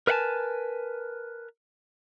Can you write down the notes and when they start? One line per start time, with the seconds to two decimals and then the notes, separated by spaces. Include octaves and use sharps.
0.07 A#4 B4 E5 F#5 G#5 A5